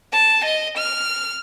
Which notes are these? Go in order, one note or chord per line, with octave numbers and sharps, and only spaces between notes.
A5
D#5
F6